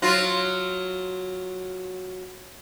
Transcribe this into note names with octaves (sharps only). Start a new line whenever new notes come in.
F#3 F4 F#4